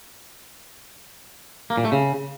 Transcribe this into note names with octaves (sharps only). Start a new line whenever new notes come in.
A#3
A#2
A3
C#3